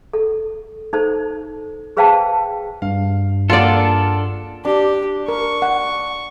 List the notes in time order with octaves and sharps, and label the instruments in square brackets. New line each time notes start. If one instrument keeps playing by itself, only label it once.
[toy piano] A4
D#4 A4 C5
G#4 B4 C5 F5 G5 A5
[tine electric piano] G2 [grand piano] F5
[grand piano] A#3 G#4 F#5 [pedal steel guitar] D4 A4 [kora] F4 D5
[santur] D4 [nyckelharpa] G4
[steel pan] A#4 [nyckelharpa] C#6
[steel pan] F#5